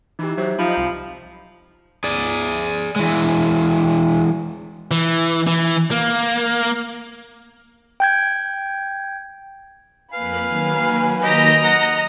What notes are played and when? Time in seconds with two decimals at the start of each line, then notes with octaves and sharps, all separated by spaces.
0.19 E3 D#4 G4
0.37 F#3 G4 C5 E5
0.59 F3 D#4 B5
0.77 C2
2.04 G#4 D5
2.96 E3 G#3
4.91 E3
5.47 E3
5.91 A#3
8.00 G5 G6 G#6
10.13 F2 A#3 B4 F5 G#5 B5
10.48 D#3 F#3 A#3
11.23 G4 D#5 A#5
11.63 F#5